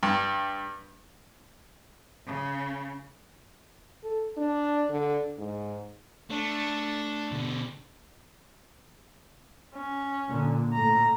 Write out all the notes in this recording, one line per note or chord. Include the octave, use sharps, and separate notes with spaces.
G2
C#3
A4
D4
D3
G#2
A3 D4
B2 D3
C#4
A#2 D3
A2 A3 A#5